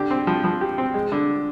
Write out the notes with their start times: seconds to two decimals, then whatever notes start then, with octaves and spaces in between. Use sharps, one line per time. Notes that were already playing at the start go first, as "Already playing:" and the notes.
Already playing: D3 G4
0.11 C4
0.27 F3
0.44 F3
0.61 G4
0.78 C4
0.94 G#3
1.12 D3